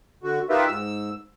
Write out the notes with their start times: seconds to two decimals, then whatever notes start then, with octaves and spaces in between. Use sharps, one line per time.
0.23 D3 F#4
0.49 D#4 F4 G4 A#4 B4 E5
0.68 G#2 E6